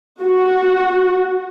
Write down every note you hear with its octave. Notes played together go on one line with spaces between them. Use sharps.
F#4